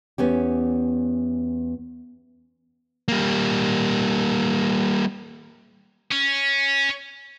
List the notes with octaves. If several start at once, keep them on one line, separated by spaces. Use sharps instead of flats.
E2 B3 C#4 G4
G3 A#3
C#4